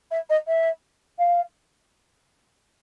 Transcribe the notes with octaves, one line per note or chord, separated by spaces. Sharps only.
E5
D#5
E5
F5